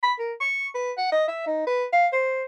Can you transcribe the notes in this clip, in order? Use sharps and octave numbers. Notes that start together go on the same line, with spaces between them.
B5
A#4
C#6
B4
F#5
D#5
E5
D#4
B4
F5
C5